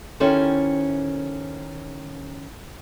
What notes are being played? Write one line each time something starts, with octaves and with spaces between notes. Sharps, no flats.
D#3 C#4 E4 G4 A4 C5